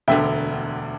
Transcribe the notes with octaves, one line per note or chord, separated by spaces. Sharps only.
E1 D2 D3 E5 G5